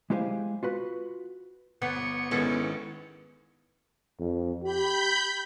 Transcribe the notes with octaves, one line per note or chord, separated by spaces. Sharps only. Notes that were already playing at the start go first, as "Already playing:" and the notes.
G#3 E4 G4 C5 F5 G#5
F4 F#4 B4
G1 B3 C#7
G#1 D#3 G#3 B3 C#4 E4 A4
F2
G4 B5 G6